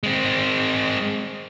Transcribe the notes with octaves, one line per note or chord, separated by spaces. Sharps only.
G#3 C4